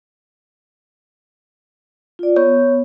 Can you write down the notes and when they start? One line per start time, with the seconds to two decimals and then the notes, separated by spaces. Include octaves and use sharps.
2.19 F4 D5
2.36 B3 C#5